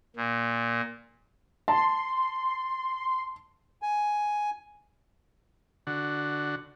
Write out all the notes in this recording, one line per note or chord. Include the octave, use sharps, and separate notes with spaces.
A#2
A5 C6
G#5
D3 F#4